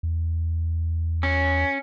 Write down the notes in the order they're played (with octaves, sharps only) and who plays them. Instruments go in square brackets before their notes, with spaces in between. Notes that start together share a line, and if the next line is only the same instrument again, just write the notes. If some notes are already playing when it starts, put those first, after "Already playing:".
[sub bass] E2
[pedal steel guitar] C#4